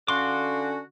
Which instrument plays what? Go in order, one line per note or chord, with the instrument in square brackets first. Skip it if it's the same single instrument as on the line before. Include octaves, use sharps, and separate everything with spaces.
[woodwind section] D3 C#4 F#4 [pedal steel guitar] F5 C6 D6